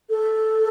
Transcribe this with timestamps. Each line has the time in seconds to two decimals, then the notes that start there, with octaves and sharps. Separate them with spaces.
0.10 A4